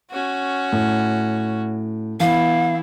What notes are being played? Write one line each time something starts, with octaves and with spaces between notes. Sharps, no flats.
C#4 F#4
A2
E3 B3 E4 F5